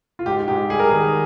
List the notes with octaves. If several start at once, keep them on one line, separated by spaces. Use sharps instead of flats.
F4
G#2 G4
G#2 G4
G3 G#4
A#4
G#4
D#3